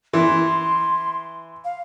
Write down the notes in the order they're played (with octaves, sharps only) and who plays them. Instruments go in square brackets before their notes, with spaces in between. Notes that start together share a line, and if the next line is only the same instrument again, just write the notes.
[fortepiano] E3 [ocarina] C6
[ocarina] F5